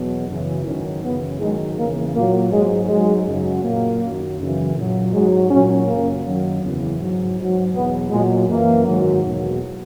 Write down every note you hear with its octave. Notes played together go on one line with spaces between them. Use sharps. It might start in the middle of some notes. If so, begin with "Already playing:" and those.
Already playing: E2 B2 F#3
F#2 C#3 E3
G#2 D#3 F#3 C#4
F#2 C#3 E3 B3
G#2 D#3 F#3 G#3
E2 C#3 E3 A#3
A#2 F#3 A#3
G#2 F#3 G#3
G#2 F#3 G#3
F#2 C#3 F#3
A#2 F#3 A#3
F#2 D#3 F#3
F#2 C#3 E3
A#2 F#3
G#2 F#3 G#3
A#2 F#3 C#4
F#2 C#3 F#3 A#3
F#2 D#3 F#3
E2 C#3 E3
G#2 F#3
G#2 F#3
E2 B2 F#3 B3
A#2 F#3 G#3
F#2 E3 A#3
G#2 D#3 F#3
E2 B2 F#3